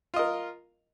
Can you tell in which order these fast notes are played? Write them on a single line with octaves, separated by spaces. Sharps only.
F4 D#5 A#4